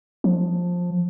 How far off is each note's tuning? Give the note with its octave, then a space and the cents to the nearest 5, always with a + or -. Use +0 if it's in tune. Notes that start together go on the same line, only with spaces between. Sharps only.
F3 +15